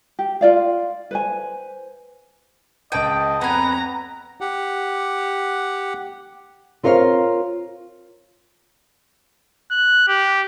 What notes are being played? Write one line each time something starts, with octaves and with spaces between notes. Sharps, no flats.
G4
F4 D5 F5
B4 C5 G#5
C#2 D#5 G5 A5 D#7
F2 B3 B4 G#5 A#5
G4 F#5
C4 F4 A#4 C#5 D5 F5
F#6
G4